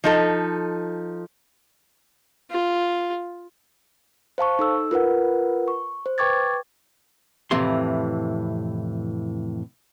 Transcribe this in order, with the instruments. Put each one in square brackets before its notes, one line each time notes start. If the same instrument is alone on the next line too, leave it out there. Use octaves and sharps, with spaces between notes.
[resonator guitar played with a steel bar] F3 D#4 A4
[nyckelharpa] F4
[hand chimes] C5 F5 A5 C#6
D#4 A4 E6
F4 A#4 B4 F#5
C#6
C5
B4 G5 C#6 D6 G#6 A6
[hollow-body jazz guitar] F2 A2 C3 E3 C6